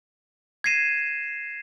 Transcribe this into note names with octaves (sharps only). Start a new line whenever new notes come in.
G#6 A#6 C7 D#7 E7